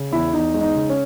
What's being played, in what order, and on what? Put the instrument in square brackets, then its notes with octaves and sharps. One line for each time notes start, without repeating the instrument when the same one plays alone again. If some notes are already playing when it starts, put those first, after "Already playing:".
Already playing: [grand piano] C#3
E2 E4
E2 D#4
G#3
D#4
C#3
C#4